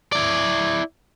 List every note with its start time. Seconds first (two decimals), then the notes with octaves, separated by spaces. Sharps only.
0.12 E4 D5